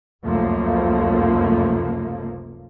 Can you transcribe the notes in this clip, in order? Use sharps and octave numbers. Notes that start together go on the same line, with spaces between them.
F1 C#2 F#2 F3 A3 A#3